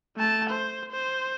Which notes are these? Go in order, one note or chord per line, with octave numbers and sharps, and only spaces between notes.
A3 A5
C5
C5